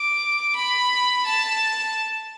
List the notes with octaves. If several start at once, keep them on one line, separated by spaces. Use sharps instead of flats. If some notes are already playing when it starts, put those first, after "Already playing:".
Already playing: D6
B5
A5